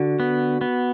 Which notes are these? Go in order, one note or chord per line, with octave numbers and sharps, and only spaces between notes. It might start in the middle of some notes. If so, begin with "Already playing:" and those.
Already playing: D3 F#4
B3
B3